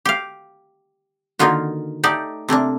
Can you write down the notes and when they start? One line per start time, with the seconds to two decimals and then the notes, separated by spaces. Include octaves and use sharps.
0.05 G4 F5
1.39 D3 D#3 A#3 D#4 F4 F#4
2.04 A3 D#4 G4 D5
2.49 C3 A3 A#3 D4